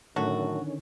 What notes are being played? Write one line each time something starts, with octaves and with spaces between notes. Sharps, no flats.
F#2 A2 D3 D#3 F#3 A3 C#4 F#4